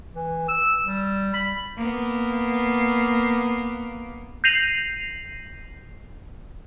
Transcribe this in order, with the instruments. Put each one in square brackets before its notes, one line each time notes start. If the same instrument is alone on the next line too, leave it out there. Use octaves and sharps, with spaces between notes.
[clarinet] E3
E6
G3
B5
[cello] A#3 B3
[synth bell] G6 A#6 C7 D#7 F7 F#7